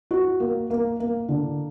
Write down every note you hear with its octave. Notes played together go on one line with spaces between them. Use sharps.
F#4
A#3
A#3
A#3
D3